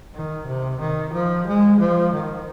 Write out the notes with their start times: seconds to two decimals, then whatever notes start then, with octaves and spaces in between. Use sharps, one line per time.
0.14 D#3
0.46 C3
0.80 D#3
1.13 F3
1.47 G#3
1.79 F3
2.13 D#3